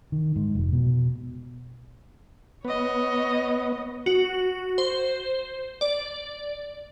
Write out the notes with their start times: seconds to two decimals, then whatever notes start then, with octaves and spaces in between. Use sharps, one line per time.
0.12 D#3
0.36 G#2
0.55 F1
0.73 B2
2.65 B3 C#5 D#5
4.06 F#4
4.78 C5
5.81 D5